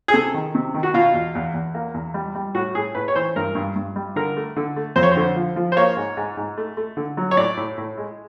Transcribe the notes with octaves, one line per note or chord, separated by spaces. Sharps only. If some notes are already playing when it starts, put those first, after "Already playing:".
G#4
C3 A4
D#3
C3
D#3
F#4
B2 F4
E2
E2
E2
A#3
E2
G3
G3
A2 F#4
A2 G#4
A2 B4
C#5
E3 C5
G2 A#4
G2
G2
G3
D3 A#4
A3
D3
A3
F2 C5
C#5
C5
D3
F3
F3
C5
A#3 C#5
G#2
G#2
G#2
A3
A3
D3
F#3
C#5
A2 D5
A2
A2
G#3